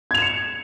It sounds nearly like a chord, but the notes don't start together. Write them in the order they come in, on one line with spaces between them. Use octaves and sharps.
G#6 F7 E7 C#7